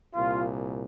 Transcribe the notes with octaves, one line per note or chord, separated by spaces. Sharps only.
C2 A#2 F4